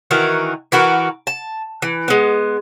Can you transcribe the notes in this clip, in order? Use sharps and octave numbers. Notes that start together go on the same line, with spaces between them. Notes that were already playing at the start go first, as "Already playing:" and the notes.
D#3 E3 F#4 A#4
E3 F#4 A#4 B4
A5
E3
G#3 B3